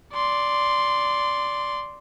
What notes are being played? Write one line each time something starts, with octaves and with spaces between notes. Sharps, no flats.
D5 C6